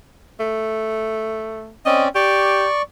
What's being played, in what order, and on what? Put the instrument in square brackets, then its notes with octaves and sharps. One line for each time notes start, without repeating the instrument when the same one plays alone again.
[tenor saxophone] A3
[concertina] C4 C#4 D5 [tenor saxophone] D#5
[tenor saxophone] G4 [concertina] D5 C#6